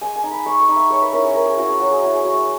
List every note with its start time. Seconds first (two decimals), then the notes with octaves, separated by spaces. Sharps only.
0.01 G#3 G#5
0.16 G#5
0.23 D#4
0.31 B5
0.46 G#3 C#6
0.60 C#6
0.69 D#4
0.76 E5
0.90 G#3 C#5
1.02 B4
1.13 C#4 E4 A#4
1.24 G#4
1.34 G#3 A#4
1.46 G#4
1.57 C#4 E4 F#4
1.69 G#4
1.79 F#3 F#4
1.91 G#4
2.02 C#4 E4 F#4
2.12 G#4
2.24 F#3 C#5